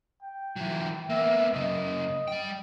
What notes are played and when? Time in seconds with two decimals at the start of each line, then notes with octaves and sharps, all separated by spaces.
0.23 G5
0.56 E3 F#3
1.10 A#3 B3 E5
1.53 F#2 C#3 D#5
2.28 G3 G5